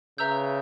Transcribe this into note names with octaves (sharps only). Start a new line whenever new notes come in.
C#3 B4 E5 A#5 E6 G6